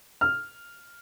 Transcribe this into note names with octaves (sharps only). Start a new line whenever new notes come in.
F6